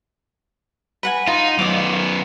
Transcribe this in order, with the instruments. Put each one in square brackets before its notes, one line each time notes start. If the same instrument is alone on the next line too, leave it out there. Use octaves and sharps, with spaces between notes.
[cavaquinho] B4 F#5 G#5
[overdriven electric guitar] D#4 [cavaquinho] F4
[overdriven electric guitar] F#2 B3 [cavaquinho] D6 D#6